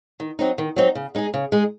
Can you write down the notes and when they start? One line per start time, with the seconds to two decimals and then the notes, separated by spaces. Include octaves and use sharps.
0.20 D#3
0.39 F#3 C4 D#4
0.58 D#3
0.76 F#3 C4 D#4
0.95 C#3
1.15 G#3 D#4 G#4
1.34 C#3
1.52 G#3 D#4 G#4